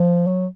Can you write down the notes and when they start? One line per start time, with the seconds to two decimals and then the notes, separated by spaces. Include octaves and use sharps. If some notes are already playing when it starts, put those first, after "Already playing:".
Already playing: F3
0.27 F#3